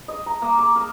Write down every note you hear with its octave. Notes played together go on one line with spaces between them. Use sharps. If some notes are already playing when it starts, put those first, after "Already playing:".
D#5
A#5
A#3
D6
A#4